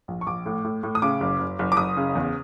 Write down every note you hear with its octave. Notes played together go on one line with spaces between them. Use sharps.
A#1
C#6
A#1 D6
A2
A2
A2
D#6
C#3 D6
F#1
F#1
F#1
D6
F#1 D#6
C#3
E2